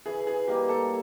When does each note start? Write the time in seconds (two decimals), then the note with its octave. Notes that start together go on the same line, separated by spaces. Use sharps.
0.06 E3 G#4
0.27 G#4
0.48 G3 A#3 D#4 G4
0.69 A4